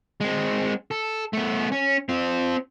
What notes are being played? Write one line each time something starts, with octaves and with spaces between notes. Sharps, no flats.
G#3 C4
A4
A3 B3
C#4
C4 F4